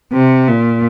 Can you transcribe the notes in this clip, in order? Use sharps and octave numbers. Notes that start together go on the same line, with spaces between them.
C3
A#2